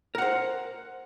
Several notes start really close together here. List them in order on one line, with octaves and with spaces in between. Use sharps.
A#4 F#5 C5